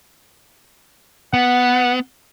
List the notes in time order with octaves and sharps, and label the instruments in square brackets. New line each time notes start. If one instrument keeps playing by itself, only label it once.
[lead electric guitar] B3 [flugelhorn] F#5